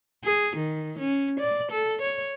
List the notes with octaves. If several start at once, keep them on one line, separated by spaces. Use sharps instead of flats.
G#4
D#3
C#4
D5
A4
C#5